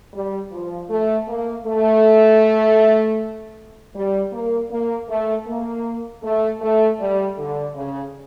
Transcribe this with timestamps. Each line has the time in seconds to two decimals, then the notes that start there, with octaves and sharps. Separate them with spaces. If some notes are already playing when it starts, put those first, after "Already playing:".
0.14 G3
0.52 F3
0.90 A3
1.28 A#3
1.66 A3
3.95 G3
4.33 A#3
4.71 A#3
5.09 A3
5.47 A#3
6.23 A3
6.61 A3
7.00 G3
7.38 D3
7.75 C#3